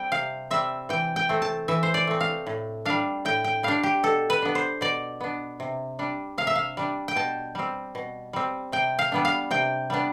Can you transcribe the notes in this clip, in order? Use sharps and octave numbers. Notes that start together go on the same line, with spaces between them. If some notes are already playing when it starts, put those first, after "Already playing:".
Already playing: G3 C4 G5
C3 F5
G3 C4 E5
E3 G5
G5
A3 C4
A5
E3 E5
C5
D5
A3 C4
F5
A2
G3 D4 F5
A2 G5
G5
G3 D4 F5
G4
B2 A4
B4
B3 D4
C5
B2 D5
B3 D4
C3
G3 D4
C3 F5
E5
F5
G3 D4
G5
B2 A5
G3 C4
B2
G3 C4
C3 G5
F5
G3 B3 D4
F5
C3 G5
G3 B3 D4